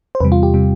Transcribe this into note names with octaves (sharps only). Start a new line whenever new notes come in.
C5
E2 C3 G3 B4
F4
G4
C3 G3